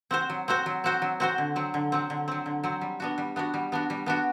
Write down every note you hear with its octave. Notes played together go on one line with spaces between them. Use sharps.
C4 F#4 C5
F#3
C4 F#4 C5
F#3
C4 F#4 C5
F#3
C4 F#4 C5
D3
F#3 C4
D3
F#3 C4
D3
F#3 C4
D3
F#3 C4
G3
B3 D4 F#4
G3
B3 D4 F#4
G3
B3 D4 F#4
G3
B3 D4 F#4